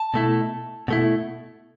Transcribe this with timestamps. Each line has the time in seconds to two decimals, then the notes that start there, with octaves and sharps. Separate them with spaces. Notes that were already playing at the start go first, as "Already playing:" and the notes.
Already playing: A5
0.14 B2 A3 E4
0.88 B2 A3 E4